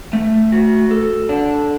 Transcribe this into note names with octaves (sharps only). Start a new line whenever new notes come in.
A3
F#4
A4
D4